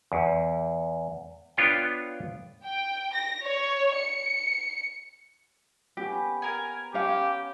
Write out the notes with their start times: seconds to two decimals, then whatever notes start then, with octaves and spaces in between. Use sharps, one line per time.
0.12 E2
1.57 B3 D4 F4 C#5 G5
2.65 G5
3.14 A#6
3.46 C#5
3.97 C#7
5.97 B3 C#4 G4 B4
6.42 A#4 G#5
6.94 C#4 G4 F5